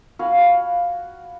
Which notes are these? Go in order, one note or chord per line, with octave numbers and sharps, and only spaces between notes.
F#4 F5 G#5 B5